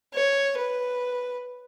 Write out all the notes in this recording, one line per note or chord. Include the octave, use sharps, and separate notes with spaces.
C#5
B4